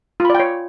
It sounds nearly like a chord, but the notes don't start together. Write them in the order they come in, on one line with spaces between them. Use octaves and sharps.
F4 B5 D5 G5 C#5